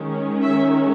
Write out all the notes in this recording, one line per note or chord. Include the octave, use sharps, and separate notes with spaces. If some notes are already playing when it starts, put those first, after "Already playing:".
Already playing: D#3 G#3 C#4
E5